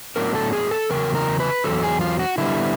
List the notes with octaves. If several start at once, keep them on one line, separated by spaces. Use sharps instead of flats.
A2 F#3 B3 D4 A#4
A4
G#4
A4
E2 C#3 F#3 A#4
A#4
B4
E2 C#3 F#3 A4
G#4
F4
F#4
D3 G3 B3 E4